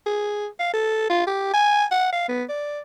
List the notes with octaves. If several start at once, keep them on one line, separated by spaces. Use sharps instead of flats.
G#4
F5
A4
F4
G4
G#5
F#5
F5
B3
D5